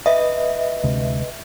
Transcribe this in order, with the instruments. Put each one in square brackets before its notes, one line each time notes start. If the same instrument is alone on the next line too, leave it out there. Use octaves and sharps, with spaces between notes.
[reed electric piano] B4 D#5 [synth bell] E5
[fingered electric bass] D2 C3 G#3